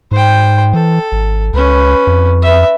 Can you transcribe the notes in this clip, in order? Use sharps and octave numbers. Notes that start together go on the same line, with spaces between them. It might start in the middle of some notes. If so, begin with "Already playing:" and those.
G#2 C5 G5
E3 A4
G#1
C#2 C#4 B4
F2
B4 E5